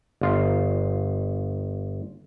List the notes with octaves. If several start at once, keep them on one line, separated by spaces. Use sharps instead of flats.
G1 F4